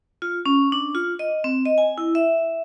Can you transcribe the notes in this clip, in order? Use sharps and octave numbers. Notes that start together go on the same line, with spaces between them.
F4
C#4
D4
F4
D#5
C4
D#5
G#5
E4
E5